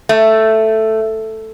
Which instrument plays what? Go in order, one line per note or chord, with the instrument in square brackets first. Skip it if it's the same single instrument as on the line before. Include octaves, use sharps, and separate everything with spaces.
[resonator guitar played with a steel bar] A3